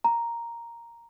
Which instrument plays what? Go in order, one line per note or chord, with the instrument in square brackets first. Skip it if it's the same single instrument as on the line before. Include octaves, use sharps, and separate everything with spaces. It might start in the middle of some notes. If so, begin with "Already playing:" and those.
[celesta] A#5